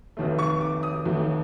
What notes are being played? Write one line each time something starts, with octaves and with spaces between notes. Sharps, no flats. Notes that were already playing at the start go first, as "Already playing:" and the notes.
F1 D#2 D#3 F#3 A3
C#6
D6
D#6
F1 D#2 D#3 F#3 A3